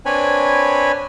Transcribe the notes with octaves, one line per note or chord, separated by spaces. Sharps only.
C4 D4 B4 C#5 G#5 B5